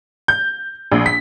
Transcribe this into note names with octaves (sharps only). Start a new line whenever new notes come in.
G6
A#1
B6